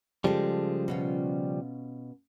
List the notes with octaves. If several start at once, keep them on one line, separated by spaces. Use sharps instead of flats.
C#3 F3 G3 G#3 G4 A4
B2 C#4 F4